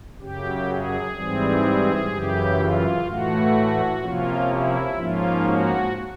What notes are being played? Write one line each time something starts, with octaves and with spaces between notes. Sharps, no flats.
F#2 C#3 F#3 G4
G#4
G#2 E3 G3 C4
F#2 C#3 E3 G4
F4
A2 E3 A3 F#4
C3 F3 A#3 C#4 F4
E4
G#2 F3 A#3 C#4 F4
F#4